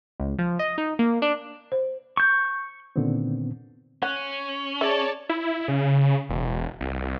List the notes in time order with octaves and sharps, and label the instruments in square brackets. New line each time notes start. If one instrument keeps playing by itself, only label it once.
[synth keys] C#2
F3
D#5
D#4
A#3
D4
[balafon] C5
[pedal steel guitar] C#6 G6
[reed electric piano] A#2 D3 D#3 B3 C4
[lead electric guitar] C#4 [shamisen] F#5 [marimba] F#6
[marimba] G#4 [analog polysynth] C#5 D5 A5 [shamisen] E5
[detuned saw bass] E4
C#3
E1
C2